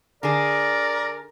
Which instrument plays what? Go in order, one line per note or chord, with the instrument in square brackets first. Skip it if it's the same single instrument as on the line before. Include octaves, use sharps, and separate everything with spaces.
[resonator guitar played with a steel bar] D3 G#4 [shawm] A#4 [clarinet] D5